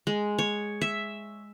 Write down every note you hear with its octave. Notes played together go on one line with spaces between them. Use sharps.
G#3
C#5
E5